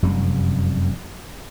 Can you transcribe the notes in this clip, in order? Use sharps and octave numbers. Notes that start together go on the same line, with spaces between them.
F1 F#2 C3 G3